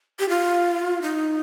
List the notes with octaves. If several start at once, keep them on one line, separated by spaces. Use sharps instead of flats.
G4
F4
D#4